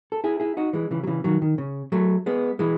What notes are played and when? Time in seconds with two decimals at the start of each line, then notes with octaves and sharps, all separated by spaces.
0.12 A4
0.24 E4 G#4
0.40 E4 G#4
0.57 D#4 F#4
0.73 E3 G#3
0.91 C#3 E3
1.03 F#3
1.07 C#3 E3
1.24 D#3 F#3
1.42 D#3
1.58 C#3
1.92 F#3 A3
2.26 G#3 B3
2.59 E3 G#3